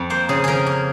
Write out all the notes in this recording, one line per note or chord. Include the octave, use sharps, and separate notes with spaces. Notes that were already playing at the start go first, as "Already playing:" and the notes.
Already playing: F2
A#3 C5
C#3 G#4
F3 G#4 A#4
A#3